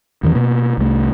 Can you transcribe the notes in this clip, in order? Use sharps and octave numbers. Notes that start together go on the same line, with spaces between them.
E2 D#3 E3 C#4
B2 A#3 B3
C2 A3